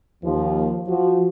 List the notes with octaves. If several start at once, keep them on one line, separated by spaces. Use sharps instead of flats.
D#2 F3
F3 F#4